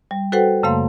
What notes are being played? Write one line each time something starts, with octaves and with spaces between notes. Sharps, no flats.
G3
F#4 A4 B4 C5 F#5 G5
F#2 C#3 A3 A#3 F5 C6